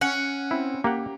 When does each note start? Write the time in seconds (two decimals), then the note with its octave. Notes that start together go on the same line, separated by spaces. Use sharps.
0.01 C#4 F#5
0.51 C4 E4
0.84 A#3 G4 F#5